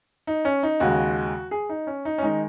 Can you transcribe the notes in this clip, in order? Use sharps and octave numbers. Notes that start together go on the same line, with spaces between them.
D#4
C#4
D#4
D#2 C#3 G#3 F#4
G#4
D#4
C#4
D#4
C#4
D#3 G#3 D#4